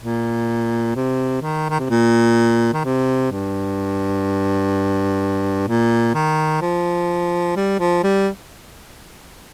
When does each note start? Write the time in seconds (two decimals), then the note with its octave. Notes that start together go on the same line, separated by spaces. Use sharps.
0.01 A#2
0.96 C3
1.42 D#3
1.70 D#3
1.80 C3
1.90 A#2
2.74 D#3
2.84 C3
3.31 G2
5.67 A#2
6.14 D#3
6.62 F3
7.56 G3
7.79 F3
8.03 G3